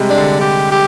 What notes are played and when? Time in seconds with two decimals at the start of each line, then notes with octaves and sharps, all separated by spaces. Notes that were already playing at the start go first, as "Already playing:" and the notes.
Already playing: C3 G3 G#3
0.10 D4
0.17 D3
0.41 G4
0.72 G4